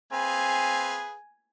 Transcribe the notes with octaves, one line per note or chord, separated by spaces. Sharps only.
C4 G#4 B4 F5 G#5